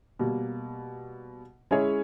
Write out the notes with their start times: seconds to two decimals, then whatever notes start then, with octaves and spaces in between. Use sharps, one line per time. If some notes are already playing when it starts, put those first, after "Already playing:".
0.19 B2 G3 A#3
1.71 G#3 C#4 E4 G#4 C#5